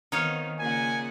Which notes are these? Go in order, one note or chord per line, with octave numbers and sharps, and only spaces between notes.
D#3 B3 C4 D#4 C#5 F5
A#2 C#3 F#5 G#5